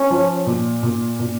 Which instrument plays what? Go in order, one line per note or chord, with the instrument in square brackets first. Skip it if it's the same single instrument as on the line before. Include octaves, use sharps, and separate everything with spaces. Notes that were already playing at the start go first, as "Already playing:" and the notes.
Already playing: [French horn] C#4
[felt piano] F3
A#2
A#2
A#2